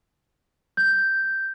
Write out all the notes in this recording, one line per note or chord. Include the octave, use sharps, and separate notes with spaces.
G6